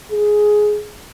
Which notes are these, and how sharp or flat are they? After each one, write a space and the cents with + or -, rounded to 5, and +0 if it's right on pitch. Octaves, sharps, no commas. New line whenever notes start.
G#4 +10